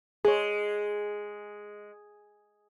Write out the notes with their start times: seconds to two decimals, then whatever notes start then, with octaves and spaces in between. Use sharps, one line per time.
0.25 G#3 G#4 C#5